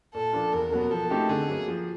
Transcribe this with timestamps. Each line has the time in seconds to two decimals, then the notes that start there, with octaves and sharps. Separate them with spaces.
0.14 A#2 A4
0.33 F3 A#3 D4 F4
0.52 E2 A#4
0.71 B2 F#3 B3
0.90 F3 A4
1.10 A3 C4 D#4 G4
1.29 D3 G#4
1.48 F#3 A#3
1.68 F3